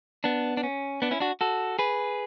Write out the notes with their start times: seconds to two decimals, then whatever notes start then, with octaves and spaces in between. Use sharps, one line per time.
0.24 B3 D4
0.57 D4
0.63 C#4
1.02 B3 D4
1.11 C#4 E4
1.20 D4 F#4
1.41 F#4 A4
1.79 G#4 B4